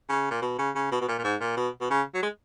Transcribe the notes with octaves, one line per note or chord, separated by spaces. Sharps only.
C#3
A#2
B2
C#3
C#3
B2
B2
A#2
A#2
G#2
A#2
B2
B2
C#3
F#3
G#3